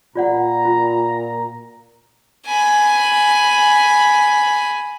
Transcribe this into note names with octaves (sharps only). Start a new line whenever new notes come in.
A#2 F4 D5 F#5 A#5
F4
G#5 B5